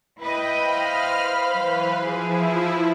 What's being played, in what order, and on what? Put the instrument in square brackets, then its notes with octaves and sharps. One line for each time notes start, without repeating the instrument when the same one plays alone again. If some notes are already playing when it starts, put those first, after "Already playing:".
[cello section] E4 B4 D#5 [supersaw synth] G5
[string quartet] C5 F5 B5 [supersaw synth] F6
[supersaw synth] E3 B4 [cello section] F#3
[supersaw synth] F3 E4 [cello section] G#4